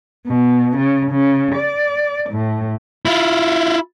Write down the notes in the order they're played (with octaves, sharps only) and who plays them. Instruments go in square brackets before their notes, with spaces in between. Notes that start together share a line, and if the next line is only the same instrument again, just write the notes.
[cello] B2
C#3
C#3
D5
A2
[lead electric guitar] E4 F4